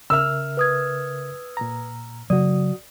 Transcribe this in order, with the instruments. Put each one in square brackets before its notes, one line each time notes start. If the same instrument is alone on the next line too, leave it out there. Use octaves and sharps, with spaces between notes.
[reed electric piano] C#3 A#4 E5 [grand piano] E6 F6
[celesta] B4 D#6 G#6
[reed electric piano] A#2 A#5
[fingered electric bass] C#3 F#3 [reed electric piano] F#4 D#6 [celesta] D5